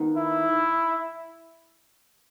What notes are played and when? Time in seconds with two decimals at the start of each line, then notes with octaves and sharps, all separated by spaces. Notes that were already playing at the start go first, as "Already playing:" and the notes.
Already playing: D#2 D#3 B3 D#4
0.17 E4